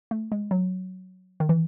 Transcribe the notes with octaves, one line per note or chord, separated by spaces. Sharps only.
A3
G#3
F#3
D#3
E3